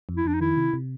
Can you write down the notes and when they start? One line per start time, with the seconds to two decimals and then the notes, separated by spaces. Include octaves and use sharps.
0.09 F2
0.17 E4
0.25 F2 D4
0.34 D#4
0.41 D#3 E4
0.57 C3
0.73 C3